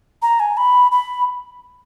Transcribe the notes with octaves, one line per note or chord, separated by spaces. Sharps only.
A#5
G#5
B5
B5